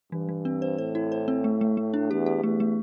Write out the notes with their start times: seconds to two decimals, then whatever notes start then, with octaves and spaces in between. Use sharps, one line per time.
0.12 G2 E3
0.29 E3
0.45 C4
0.62 C5
0.78 A2 C5
0.95 E4
1.12 C5
1.28 C4
1.44 A3
1.61 A3
1.77 A3
1.94 D4
2.10 E2 G4
2.26 G4
2.43 E2 A3
2.60 A3